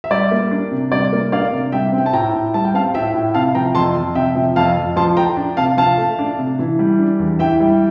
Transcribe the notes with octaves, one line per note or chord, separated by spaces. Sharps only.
E5
G3 D5
A#3
D4
C3
G3 D5
A#3
D4 D5 F5
C3
G3 E5 G5
C4
G5
A5
A2 G5 A#5
A2
G3 A5
G5
C4 F5 A5
A2 E5 G5
A2
C3 F5 A5
F3 G5 A#5
F2 A5 C6
F2
C3 E5 G5
F3
F2 F5 A5
F2
F3 A5 C6
A3 G5 A#5
D4
C3 F5 A5
F3 F5 A5
A3
D4
C3
E3
G3
D4
E2
E3 E5 G5
G3